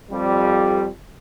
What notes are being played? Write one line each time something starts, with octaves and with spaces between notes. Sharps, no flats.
F2 G3